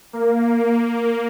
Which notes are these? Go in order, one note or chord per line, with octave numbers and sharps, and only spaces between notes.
A#3